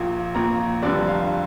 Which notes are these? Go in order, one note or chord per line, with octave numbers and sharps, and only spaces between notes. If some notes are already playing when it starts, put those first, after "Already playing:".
Already playing: A#1 A#2 A#3
A#1 A#2 A#3 A#5
F1 F2 D3 G3 D5
F5